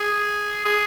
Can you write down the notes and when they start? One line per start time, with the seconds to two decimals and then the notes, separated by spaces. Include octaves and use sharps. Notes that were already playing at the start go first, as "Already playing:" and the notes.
Already playing: G#4
0.65 G#4